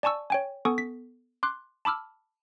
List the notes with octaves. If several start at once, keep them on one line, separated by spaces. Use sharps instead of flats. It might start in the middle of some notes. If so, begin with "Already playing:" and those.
D5 G#5 A5 C#6 E6
C#5 G5 G#5
B3 A4 G#5 C#6 D#6
B6
C6 D6 F#6
A5 B5 D6 E6 F6